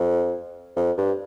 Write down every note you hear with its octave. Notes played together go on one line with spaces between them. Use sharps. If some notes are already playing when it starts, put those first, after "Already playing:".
Already playing: F2
F2
G2